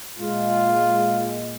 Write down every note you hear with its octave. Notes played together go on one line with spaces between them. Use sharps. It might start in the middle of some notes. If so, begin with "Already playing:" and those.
A#2 G#3 F4